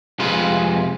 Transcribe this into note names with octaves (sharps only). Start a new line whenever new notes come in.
F2 C3 G#3 F4 B4 C6